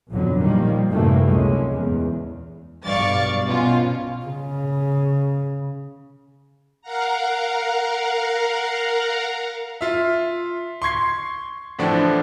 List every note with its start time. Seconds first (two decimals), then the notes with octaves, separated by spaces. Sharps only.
0.11 B1 F2 G#2 D3 F#3
0.41 A#2 D#3 F3 G3 A#3
0.89 F#2 A2 C3 E3 A3 A#3
1.28 C#2 G#3 C#4
1.71 E2
2.85 B1 G2 D5 F5 C#6 A6
3.46 B2 C#4 F4
4.25 C#3
6.81 A#4 F5 F#5 A#5
9.81 F4 E5
10.82 C6 C#6 G#6 C7
11.79 A2 D3 E3 F3 D4